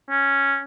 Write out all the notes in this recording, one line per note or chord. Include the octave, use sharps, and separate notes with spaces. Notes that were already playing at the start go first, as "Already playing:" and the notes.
C#4